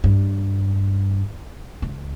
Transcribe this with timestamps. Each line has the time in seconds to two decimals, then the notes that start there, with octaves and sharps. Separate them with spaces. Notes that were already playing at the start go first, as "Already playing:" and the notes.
0.04 G2
1.82 C#2